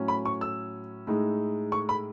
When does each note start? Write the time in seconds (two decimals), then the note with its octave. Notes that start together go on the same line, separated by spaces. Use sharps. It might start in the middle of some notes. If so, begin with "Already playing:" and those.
Already playing: A2 F#3 C#4
0.08 B5
0.25 C#6
0.41 E6
1.07 A2 G#3 D#4
1.72 C#6
1.89 B5